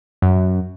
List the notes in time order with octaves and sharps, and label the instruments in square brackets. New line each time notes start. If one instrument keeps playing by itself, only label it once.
[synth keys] F#2